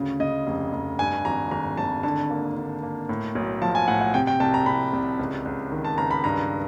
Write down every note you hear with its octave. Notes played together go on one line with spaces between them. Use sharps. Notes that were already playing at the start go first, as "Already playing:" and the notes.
Already playing: D2 C#3
C#3 D#5
F1
F1
G2 G#5
G#1 A#5
G#1 A#5
G#1 A5
D3 A5
A#3
D3
A#3
A2
B1
F3 A5
G#5
A2 F#5
F#5
C3 G5
G5
C2 A5
A#5
C2 B5
C2
C#2
C#2
D#3
A5
C#2 A#5
B5
G2 A#5